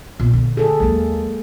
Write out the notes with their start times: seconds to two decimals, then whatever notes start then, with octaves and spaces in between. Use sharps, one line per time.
0.20 A#2 B3
0.33 D3
0.57 G#4 A4
0.80 D#2 F#3 G#3 A#3